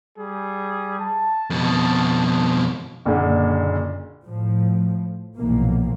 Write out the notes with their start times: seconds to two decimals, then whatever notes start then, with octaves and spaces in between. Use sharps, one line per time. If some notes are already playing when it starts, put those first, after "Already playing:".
0.18 G3 G#4
1.00 A5
1.50 F2 B2
3.05 F#1 A#2 D3
4.25 A2 F3
5.37 B1 G2 A#2 E3 F3 A#3